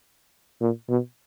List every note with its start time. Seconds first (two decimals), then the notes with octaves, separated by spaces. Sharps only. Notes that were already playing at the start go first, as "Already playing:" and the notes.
0.61 A#2
0.90 B2